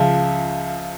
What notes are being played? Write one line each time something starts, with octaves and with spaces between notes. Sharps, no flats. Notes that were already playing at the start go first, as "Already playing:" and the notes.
Already playing: C#2 C#3 F3 E5